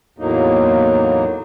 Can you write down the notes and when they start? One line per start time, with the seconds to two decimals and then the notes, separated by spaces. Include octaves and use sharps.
0.19 E2 A2 F#3 A#3 D#4